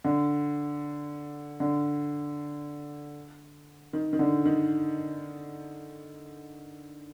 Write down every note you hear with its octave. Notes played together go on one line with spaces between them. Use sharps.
D3
D3
D#3
D#3
D3
D#3